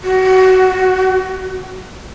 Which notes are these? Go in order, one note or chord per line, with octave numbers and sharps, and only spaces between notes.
F#4